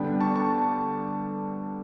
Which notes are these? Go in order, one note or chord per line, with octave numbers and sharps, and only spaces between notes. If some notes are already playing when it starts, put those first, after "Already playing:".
Already playing: D3 G3 B3 D4 G5 B5
A5 C#6
A5 C#6